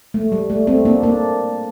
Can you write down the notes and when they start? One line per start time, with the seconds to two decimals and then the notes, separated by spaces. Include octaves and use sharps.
0.14 A3
0.32 G3
0.50 A3
0.67 A3 C4
0.85 A#3 D4
1.03 A#3 D4